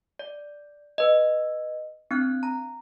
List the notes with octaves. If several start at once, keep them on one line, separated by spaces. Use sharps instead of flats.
D5
B4 D#5
C4 D4 F#6
A#5